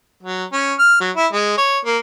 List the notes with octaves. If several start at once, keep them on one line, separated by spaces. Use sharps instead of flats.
F#3
C#4
F6
F#3
E4
G#3
C#5
A#3